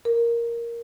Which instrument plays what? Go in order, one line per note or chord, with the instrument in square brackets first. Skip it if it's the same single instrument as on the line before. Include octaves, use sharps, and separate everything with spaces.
[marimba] A#4